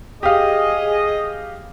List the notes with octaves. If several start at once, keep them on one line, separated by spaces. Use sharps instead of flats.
G4 G#4 D#5 F5